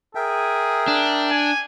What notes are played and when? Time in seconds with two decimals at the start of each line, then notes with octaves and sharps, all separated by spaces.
0.15 G#4 A#4 E5 G5
0.88 D4
1.31 G#5